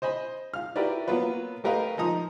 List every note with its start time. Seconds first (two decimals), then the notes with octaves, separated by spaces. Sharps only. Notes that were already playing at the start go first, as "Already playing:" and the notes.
0.02 C5 D#5 G#5 B5
0.54 F5 F6
0.76 E4 F#4 G4 A#4 B4 D5
1.08 F#3 A#3 B3 F4 B4
1.64 A3 G4 A#4 B4 D#5 F5
1.98 F3 D#4 A#5 D#6